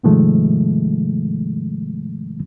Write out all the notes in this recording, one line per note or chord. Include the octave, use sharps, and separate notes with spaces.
G#2 C3 D#3 F3 G#3 A3